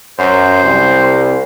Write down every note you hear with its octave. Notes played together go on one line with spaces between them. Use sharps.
F#2 C5
C2